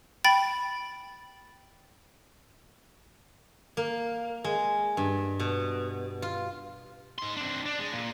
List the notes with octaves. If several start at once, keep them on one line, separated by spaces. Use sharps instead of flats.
G5 B5 A6
A#3
G#3
G2
B2
F4
D#4 C6
C4 D4
D4
G#3
A#2